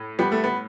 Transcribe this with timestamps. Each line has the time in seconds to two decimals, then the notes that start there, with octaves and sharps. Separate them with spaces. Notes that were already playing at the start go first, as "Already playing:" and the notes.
Already playing: A2
0.19 G3 B3
0.32 A3
0.44 B3